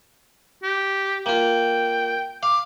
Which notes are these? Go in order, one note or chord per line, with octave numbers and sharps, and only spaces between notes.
G4
A#3 F4 G5
F5 D6